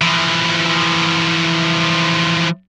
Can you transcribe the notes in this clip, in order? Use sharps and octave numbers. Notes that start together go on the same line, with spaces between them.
E3 F3